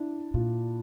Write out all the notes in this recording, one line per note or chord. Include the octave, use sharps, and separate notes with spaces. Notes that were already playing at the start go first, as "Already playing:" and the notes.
Already playing: D4 E4
A#2 F4